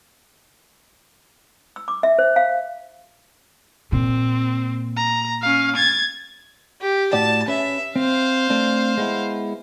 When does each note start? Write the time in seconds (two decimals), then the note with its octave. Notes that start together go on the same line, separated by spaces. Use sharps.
1.76 E6
1.88 D6
2.03 E5
2.19 C5
2.36 F5
3.92 A#2 C4
4.97 A#5
5.42 C#4 F5
5.76 G#6 A6
6.81 G4
7.13 A2 F#4 D5 A5
7.48 C#4 B4 E5
7.96 C4 C5 F5
8.50 A3 C4 D4
8.97 G#3 B3 E4